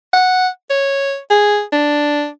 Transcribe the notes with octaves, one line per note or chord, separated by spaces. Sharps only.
F#5
C#5
G#4
D4